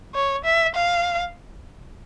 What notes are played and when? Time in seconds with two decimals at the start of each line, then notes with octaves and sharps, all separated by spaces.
0.14 C#5
0.45 E5
0.75 F5